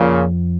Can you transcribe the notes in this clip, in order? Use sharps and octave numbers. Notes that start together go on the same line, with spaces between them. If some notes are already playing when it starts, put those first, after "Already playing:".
Already playing: F2 A#2 C#3